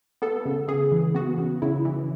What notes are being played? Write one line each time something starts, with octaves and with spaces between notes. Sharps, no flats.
B3 A4
C#3
C#3 G#4
E3
B3 F#4
C#3
C#3 E4
E3